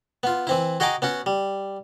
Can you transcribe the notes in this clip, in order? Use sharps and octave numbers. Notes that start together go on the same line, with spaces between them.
B3 F4
E3 C4 E4
F#4 G#4 D#5 G5 A#5 D6
B3 C#4 F#4
G3